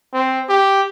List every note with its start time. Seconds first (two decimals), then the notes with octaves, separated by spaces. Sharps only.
0.14 C4
0.49 G4